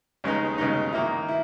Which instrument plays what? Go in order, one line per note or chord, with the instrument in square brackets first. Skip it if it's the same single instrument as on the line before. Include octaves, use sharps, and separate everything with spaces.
[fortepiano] D#2 C#3 G#3 B3 D#4
D#2 C#3 G#3 B3 D#4
D#3 A#3 E4
E4